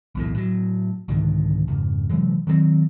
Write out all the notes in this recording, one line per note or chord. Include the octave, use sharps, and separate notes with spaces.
B1 E2 A2
A2 F#3
C2 G#2 D3 D#3
F2 G#2 C#3
C3 E3 F#3 G#3
D#3 F#3 G3 C4